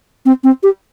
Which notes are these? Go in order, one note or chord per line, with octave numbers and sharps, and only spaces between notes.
C4
C4
G4